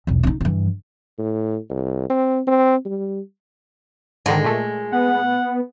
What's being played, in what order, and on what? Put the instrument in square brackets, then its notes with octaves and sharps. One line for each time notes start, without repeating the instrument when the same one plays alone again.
[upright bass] B1 E2
D4 D#4
G2 E3
[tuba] A2
C2
C4
C4
G3
[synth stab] G#2 D3 D#3 [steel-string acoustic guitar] G#3
[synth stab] A#2 A3
[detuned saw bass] B3 [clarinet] F#5